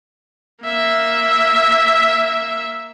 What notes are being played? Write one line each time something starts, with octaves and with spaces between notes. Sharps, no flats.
A#3 E5